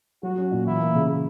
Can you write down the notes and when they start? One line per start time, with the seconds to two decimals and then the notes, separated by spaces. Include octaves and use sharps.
0.23 F#3 F#4
0.38 C#4
0.51 A#2
0.67 E3 E4
0.80 A#3
0.95 C#3